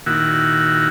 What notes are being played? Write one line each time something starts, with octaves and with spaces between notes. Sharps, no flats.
A#2 D#3 E4 F#4